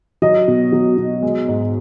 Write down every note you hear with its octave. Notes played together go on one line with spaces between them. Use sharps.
F#3 D#5
B2
F#3
B2
G#3
G#2